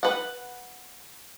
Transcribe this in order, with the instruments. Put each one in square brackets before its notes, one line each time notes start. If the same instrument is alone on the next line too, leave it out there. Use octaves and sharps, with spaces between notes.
[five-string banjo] B4 F#5